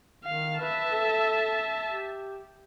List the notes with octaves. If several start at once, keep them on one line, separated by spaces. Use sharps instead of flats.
D#3 F5
B4 E5 A5
A4
G4